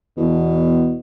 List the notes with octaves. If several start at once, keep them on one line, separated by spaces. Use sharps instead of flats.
E2 B2